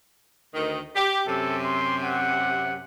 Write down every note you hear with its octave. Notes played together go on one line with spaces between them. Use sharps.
D2 D#3
G4
F#2 C3 A4
C6
F#5